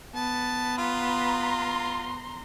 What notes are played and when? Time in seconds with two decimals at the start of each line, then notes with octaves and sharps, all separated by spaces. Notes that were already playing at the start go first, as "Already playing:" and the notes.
0.15 B3 A5
0.78 F4 A#5 C6